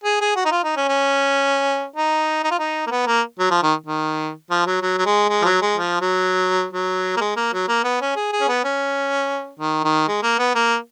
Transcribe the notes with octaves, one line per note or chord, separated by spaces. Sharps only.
G#4
G#4
F#4
D#4
F4
D#4
C#4
C#4
D#4
D#4
F4
D#4
A#3
B3
A#3
F#3
F3
D#3
D#3
F3
F#3
F#3
F#3
G#3
G#3
F3
F#3
G#3
F3
F#3
F#3
A#3
G#3
A#3
F#3
A#3
B3
C#4
G#4
G#4
C#4
B3
C#4
D#3
D#3
G#3
A#3
B3
A#3